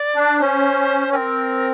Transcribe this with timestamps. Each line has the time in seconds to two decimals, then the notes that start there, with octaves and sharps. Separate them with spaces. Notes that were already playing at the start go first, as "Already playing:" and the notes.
Already playing: D5
0.16 D4
0.40 C#4 C5
1.12 C4 B4
1.16 A#4